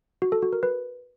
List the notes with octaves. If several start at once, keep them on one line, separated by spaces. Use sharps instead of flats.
F#4
A4
F#4
A#4
B4